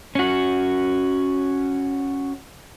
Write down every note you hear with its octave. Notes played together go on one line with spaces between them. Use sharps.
C#4 F#4